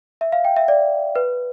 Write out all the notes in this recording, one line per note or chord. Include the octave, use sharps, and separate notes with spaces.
E5
F5
G5
E5
D5
B4